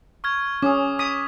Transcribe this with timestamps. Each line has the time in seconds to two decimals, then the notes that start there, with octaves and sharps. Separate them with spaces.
0.24 C#6 F6 G#6
0.62 C#4 D6 D#6
0.99 D#6 B6